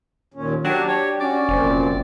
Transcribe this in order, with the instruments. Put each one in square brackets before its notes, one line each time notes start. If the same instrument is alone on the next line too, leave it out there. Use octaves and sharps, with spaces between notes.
[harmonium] D#2 A#2 C#4
[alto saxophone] F#3 [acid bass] D4 [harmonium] G4 [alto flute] G5
[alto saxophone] C#5
[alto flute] C#4 [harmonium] F#4 [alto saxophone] D5
[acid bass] F1 [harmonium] F#2 A#2 C4